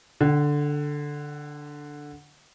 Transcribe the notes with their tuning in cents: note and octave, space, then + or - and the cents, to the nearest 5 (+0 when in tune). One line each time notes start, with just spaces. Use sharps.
D3 +0 F#5 +45